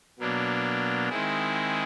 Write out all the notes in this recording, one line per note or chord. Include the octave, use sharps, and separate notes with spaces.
B2 F#3 A#3 D4
D#3 G#3 C4 E4 G#4